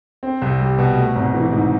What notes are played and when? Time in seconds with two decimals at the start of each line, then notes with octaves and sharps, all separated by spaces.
0.23 C4
0.42 C2
0.60 G3
0.79 B2
0.97 A3
1.15 G#1
1.34 E3
1.52 G#2